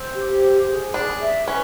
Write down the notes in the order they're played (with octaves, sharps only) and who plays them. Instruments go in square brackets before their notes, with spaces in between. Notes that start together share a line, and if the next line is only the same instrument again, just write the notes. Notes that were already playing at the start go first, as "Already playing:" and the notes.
Already playing: [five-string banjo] C4 [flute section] C5
[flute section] G4
C5
G#4
[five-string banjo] D4 [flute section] G#4
[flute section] E5
[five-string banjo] C#4 [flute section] B4